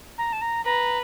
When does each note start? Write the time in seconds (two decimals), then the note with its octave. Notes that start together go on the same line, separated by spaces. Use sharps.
0.18 A#5
0.32 A5
0.41 A#5
0.64 B4 A#5